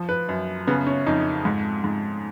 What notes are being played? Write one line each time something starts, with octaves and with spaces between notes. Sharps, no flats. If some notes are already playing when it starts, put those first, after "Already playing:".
Already playing: F3
B4
F#2
C#3 B3
C#4
F2 D#4
G#2
G#2